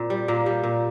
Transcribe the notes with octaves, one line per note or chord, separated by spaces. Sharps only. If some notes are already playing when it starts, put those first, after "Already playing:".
Already playing: A#2 C4
G3
A#2 A#3
G3
A#2